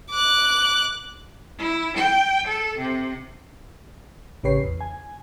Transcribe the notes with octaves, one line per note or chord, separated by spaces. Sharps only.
D6 F#6
E4
G5
A4
C3
A1 C#3 G4 B4 C#5 C7
E2
G#5